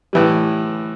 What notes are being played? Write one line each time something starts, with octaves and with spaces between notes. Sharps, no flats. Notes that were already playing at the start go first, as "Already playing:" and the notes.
A2 E3 G3